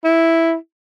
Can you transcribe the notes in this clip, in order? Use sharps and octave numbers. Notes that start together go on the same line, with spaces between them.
E4